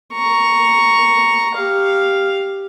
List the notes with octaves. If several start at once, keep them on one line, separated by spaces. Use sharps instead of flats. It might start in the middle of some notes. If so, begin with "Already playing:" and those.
A#5 C#6
G4 F5